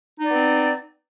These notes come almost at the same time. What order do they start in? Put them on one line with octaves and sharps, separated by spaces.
D#4 D5 B3 C4